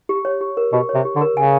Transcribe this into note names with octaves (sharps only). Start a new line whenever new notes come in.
G4
C#5
G4
A#4
B2 G4
C#5
C3
G4
D3
A#4
C#3 G#5